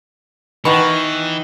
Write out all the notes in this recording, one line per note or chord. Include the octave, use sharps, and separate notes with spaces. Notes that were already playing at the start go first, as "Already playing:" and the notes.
B2 D#3 E3 B3 C#6